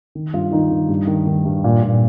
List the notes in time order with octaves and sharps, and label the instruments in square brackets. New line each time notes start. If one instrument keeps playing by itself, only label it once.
[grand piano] D#3
G2 F4
D#3 D#4
D#3
G2
D#3
D#3
G2
A#2
A#2